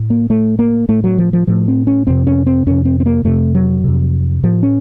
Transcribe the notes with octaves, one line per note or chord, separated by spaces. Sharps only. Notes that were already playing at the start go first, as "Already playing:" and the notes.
Already playing: A2
A#3
A2 A3
A#3
A2 A3
F#3
F3
F3
A2 F3
C4
C#4
F2 C3 C4
C#4
C4
F2 C3 C#4
C4
C4
A#3
F2 C3 A3
F#3
F2 C3
A2 F3
C#4